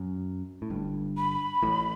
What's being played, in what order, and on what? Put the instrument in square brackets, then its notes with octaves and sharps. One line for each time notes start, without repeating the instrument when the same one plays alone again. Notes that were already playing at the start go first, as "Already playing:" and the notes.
Already playing: [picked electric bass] F#2
A2
G1 G2
[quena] B5
[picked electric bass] A1 A2